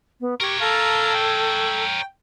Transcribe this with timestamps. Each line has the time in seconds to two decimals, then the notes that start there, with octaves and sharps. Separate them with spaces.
0.20 B3
0.40 G4 A#4 C#5 C#6
0.61 A4 F5 A5 A#5
1.14 G5